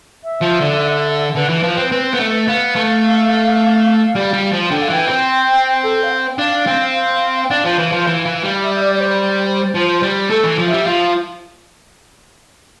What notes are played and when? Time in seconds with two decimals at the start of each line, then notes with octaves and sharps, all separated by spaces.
0.24 E5
0.42 F3
0.61 D3
1.31 A4
1.36 D3 B4
1.49 E3
1.63 F3
1.77 C4
1.92 C4
2.14 B3
2.19 A3
2.48 B3 F5
2.75 A3
4.15 G3
4.33 G3
4.52 F3
4.71 D3 G5
4.82 F5
4.89 E3 G5
5.08 C4
5.83 A4
6.03 F5
6.10 G5
6.38 D4 F5
6.67 C4
7.43 G5
7.50 D4 F5
7.65 F3
7.79 E3
7.92 F3
8.07 E3
8.25 E3
8.43 G3
8.63 E5
8.74 E5
8.81 D5
8.95 D5
9.00 C5
9.74 F3
10.02 G3
10.30 A3 A4
10.44 E3
10.58 F3
10.67 E5
10.73 G3
10.86 F3 F5